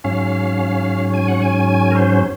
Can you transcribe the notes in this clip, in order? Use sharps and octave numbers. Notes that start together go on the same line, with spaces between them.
G#2 F#3 C#4 F5
G#5
F#5
G#5
G#5
A#4
C5